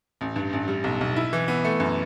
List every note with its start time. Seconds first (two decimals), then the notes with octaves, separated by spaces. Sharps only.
0.21 A1
0.36 G2
0.53 A1
0.68 G3
0.84 B1
1.01 B1
1.16 E4
1.33 E3
1.48 B3
1.64 A3
1.80 F#2